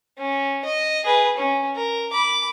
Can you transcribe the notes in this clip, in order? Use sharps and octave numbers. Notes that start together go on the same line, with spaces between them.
C#4
D#5
G#4 B4
C#4
A#4
B5 D6